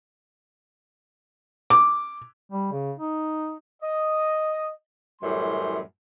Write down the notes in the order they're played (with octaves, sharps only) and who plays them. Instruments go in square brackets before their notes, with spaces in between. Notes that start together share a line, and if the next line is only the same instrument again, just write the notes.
[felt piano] D6
[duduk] G3
C#3
D#4
[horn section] D#5
F#2 A2 E3 G3 C#4 C6